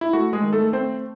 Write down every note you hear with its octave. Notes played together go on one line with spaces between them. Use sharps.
E4
A3 F#4
G#3 G#4
D#3
A3 A4
A3 C4 C5